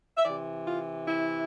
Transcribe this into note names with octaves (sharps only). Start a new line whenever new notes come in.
E5
C3 E3 D5
F4
E4